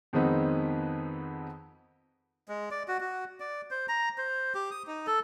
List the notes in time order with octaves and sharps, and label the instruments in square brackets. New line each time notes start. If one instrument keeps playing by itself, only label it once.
[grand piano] F2 D#3 G#3 B3 C4 D#4
[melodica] G#3
D5
F#4
F#4
D5
C5
A#5
C5
G4
D#6
D#4
A4